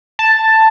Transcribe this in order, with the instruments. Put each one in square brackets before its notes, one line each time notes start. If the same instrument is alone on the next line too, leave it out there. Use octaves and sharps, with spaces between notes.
[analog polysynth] A5